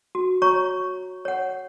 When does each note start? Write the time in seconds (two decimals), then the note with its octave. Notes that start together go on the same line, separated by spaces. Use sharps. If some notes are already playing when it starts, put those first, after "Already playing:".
0.15 F#4
0.42 C#5 A#5 C#6
1.25 C#5 F#5